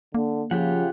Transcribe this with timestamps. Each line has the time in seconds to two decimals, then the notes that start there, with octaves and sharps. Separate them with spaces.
0.14 D3 A#3
0.51 C#3 F3 F4 G4 F#5